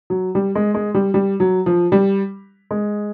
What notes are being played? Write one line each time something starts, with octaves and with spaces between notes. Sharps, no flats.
F#3
G3
G#3
G#3
G3
G3
F#3
F3
G3
G#3